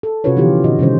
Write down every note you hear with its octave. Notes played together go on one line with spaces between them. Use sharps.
A4
C3 C#4 F4 F#4 B4 C#5
D3 E3 F3 B3 F4 G4
A#2 D3 F#4 D#5
C3 D#3 G3 C#4 C5